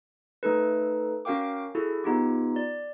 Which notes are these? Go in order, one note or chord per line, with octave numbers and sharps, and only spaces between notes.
A3 D#4 A4 B4
C#4 F#4 A#4 F5 G5 D6
E4 F#4 G#4 A4
B3 D#4 F4 G4
D5